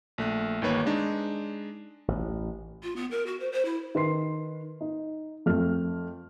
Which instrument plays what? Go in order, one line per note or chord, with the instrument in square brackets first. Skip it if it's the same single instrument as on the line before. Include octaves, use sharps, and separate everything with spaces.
[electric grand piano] A#1 A3 F#6
G1 D#2 D#3 A#3 B4 C#5
G#3 D4 D#4
[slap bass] A1
[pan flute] F4
B3
A#4
F#4
C5
C5
E4
[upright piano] D#3 B4 C6 C7
D#4
F2 A3 F6